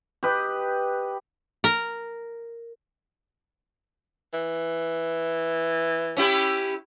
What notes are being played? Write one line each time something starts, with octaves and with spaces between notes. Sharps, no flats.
G4 B4 D#5
A#4
E3
C#4 E4 G4